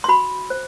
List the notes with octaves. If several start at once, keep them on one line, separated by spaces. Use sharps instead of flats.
C6
F#4 B5
C5